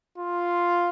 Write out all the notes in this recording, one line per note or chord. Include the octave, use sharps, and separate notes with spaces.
F4